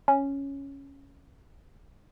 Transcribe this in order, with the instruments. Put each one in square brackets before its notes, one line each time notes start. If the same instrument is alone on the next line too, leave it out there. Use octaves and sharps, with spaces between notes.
[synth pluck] C#4